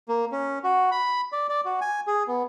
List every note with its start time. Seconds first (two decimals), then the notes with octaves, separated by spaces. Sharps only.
0.08 A#3
0.32 C#4
0.64 F#4
0.91 B5
1.32 D5
1.49 D5
1.65 F#4
1.81 G#5
2.07 G#4
2.28 B3